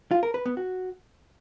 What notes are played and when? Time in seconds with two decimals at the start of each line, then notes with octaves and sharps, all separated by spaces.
0.11 F4
0.23 A#4
0.34 B4
0.46 B3
0.57 F#4